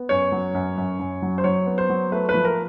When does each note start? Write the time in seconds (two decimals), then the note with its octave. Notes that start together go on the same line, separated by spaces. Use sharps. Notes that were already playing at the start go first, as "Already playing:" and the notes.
Already playing: B3
0.09 F#2 C#5
0.32 F#3
0.55 F#2
0.78 F#2
0.99 F#2
1.22 F#3
1.38 C5
1.44 F#3 C#5
1.66 B3
1.78 C5
1.89 F#3
2.12 A3 B4
2.29 B4
2.34 F3
2.45 A#4